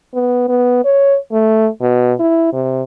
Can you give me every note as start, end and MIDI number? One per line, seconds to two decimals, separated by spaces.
0.14 0.46 59
0.49 0.83 59
0.85 1.17 73
1.32 1.68 57
1.81 2.13 47
2.20 2.52 64
2.53 2.82 48